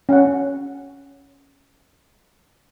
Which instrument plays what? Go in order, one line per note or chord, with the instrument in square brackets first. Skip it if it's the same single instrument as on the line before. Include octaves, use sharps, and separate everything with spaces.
[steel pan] C#4 F#5